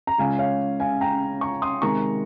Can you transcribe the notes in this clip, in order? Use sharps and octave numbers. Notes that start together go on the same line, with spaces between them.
A#5
C#2 C#3 G#3 C#4 F5 G#5
C#5 F5
F5 G#5
G5 A#5
A#5 C#6
C6 D#6
C3 D#3 G#3 A#5 C#6